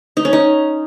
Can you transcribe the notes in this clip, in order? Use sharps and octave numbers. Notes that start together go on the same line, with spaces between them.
D#4
C#4
D#4